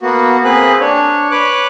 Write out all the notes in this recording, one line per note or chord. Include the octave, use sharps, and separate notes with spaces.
A#3 B3 F#4
A#3 C4 G#4 B4 F#6
D4 C#5
B4 C#5 D6 F#6